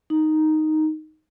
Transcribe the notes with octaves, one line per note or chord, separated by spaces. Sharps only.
D#4